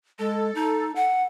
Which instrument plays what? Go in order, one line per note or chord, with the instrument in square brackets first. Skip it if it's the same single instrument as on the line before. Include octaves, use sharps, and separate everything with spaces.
[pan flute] G#3 [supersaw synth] A4
[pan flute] D#4
F#5